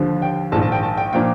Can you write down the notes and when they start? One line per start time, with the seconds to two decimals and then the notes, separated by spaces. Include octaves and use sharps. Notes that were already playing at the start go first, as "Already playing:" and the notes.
Already playing: D#2 D3 F3
0.22 G5
0.52 A#1 A5
0.55 G#2 D#3
0.62 A5
0.72 G5
0.83 A5
0.97 G5
1.13 A#2 F3 A#3 D4 G5